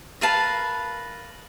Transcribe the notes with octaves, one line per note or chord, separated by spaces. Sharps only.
A#4 B4 F5 A5